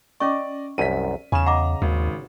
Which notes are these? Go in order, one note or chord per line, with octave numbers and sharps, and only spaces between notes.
C#4 D5 D#5 C#6 D6
C2 F#2 B6 D#7
E2 C#3 C#4 G#5 E7
D#5 F#5 A#5 D6
G#1 D#2